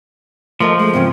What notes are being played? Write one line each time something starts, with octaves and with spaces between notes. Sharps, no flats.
F3 A3 A#4 D#5
G#3 A3
E2 G#2 C#3 C4